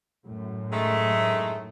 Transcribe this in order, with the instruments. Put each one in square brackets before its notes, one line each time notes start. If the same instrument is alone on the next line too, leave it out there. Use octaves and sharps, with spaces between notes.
[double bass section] F#2 A2
[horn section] D#3 G#3 A3